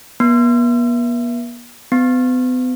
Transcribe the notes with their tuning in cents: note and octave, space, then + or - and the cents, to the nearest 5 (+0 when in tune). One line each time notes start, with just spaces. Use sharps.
B3 -45
B3 +40